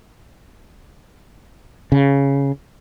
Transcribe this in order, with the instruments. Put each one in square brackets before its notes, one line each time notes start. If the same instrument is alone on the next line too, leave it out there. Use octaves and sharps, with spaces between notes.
[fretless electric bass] C#3